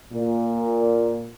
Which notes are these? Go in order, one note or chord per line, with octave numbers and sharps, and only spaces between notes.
A#2